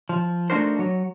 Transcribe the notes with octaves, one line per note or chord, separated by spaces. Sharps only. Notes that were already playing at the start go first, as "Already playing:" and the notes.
F3
A3 D4 D#4 F#4 A#4 C5
F#3 C#5